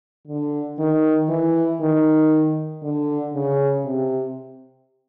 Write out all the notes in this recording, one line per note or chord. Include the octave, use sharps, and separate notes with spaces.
D3
D#3
E3
D#3
D3
C#3
C3